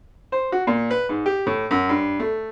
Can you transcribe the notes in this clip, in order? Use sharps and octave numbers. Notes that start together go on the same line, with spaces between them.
C5
F#4
A#2
B4
G#2
G4
A2
F#2
G2
A3